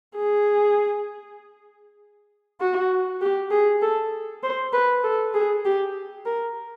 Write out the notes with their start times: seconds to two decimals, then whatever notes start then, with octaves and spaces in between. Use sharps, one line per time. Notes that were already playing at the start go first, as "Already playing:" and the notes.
0.16 G#4
2.61 F#4
3.21 G4
3.51 G#4
3.82 A4
4.43 C5
4.73 B4
5.03 A4
5.34 G#4
5.65 G4
6.26 A#4